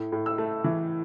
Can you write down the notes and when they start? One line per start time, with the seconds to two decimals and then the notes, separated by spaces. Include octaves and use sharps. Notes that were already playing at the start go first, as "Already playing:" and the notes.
Already playing: A2
0.12 A2
0.26 E6
0.38 A3
0.64 E3